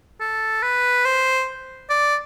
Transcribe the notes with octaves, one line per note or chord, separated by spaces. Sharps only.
A4
B4
C5
D5